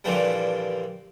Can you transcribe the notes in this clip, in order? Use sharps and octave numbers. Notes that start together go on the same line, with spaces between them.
G2 A#2 D3 E3 F3 G3